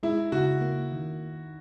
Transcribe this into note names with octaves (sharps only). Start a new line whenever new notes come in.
G#3 E4
C#3 F#4
A#3
D#3